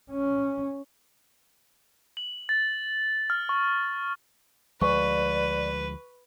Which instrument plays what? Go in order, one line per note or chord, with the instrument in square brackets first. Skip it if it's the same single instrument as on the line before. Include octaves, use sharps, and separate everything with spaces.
[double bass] C#4
[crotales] F#7
A6
F6
C#6
[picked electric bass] D2 F3 G#3 [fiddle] B4 [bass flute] D5 [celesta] C#6